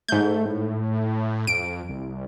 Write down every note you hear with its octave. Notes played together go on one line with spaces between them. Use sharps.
G#2 A3 G6
A2
F2 D7
C2